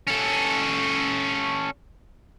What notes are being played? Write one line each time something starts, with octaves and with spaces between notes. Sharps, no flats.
C#4 A4